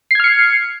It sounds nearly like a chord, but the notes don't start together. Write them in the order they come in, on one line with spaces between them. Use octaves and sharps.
C7 G#6 F6 C#7